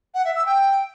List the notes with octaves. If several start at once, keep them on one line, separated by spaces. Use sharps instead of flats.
F#5
E5
E6
G5